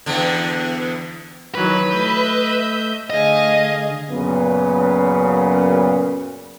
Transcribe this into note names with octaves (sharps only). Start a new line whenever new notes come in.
E2 D3
D#3 E3 F#3 B4 F#6
A3 D#5 E5 G6
D3 A3 G#4 D#5 F5 G#5
F#2 A#2 C#3 B3